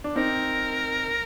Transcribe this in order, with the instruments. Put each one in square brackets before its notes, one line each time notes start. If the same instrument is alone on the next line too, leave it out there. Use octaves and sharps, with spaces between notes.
[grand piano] D4
[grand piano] C4 D#4 [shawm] A#4